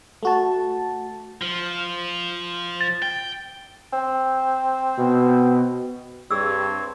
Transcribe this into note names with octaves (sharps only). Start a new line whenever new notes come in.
A3 F#4 A5
F3
A6
G5
C4
B2
G2 C4 G#4 C#5 E6